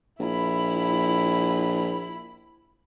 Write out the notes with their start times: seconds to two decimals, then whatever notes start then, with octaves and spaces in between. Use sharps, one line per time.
0.20 A#1 E4 B5